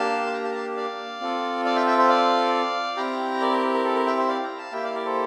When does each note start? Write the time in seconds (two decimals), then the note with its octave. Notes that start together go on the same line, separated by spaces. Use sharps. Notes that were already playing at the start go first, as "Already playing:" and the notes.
Already playing: A#3 D4 G4 F5 A5
0.26 C6
0.33 G5 A#5
0.44 F5 A5
0.51 A#5
0.55 F5 A5
0.77 D5 F5
1.21 C4 F4 A4
1.65 D5 F5
1.76 E5 G5
1.87 E5 G5
1.98 C5 E5
2.09 D5 F5
2.97 C4 E4 G4 G5 A#5
3.41 A#4 D5
3.51 A#4
3.74 A#4
3.84 A4
3.96 A#4
4.07 E5 G5
4.17 C5 E5
4.29 D5 F5
4.43 G5 A#5
4.58 F5 A5
4.72 A#3 E4 G4 E5 G5
4.84 D5 F5
4.94 A#4 D5
5.05 A4 C5